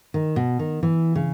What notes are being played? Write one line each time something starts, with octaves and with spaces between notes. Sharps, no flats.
D#3
B2
D#3
E3
C#3